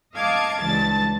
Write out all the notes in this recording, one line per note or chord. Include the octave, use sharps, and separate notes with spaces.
D#5 F5 A5 D6 G#6
C#2 G2 E3 A5 A6